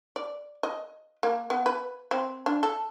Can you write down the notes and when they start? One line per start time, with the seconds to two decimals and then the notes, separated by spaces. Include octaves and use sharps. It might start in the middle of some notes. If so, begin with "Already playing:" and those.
0.16 D5
0.63 D#5
1.23 A#3
1.50 B3
1.66 B4
2.11 C4
2.46 D4
2.63 A4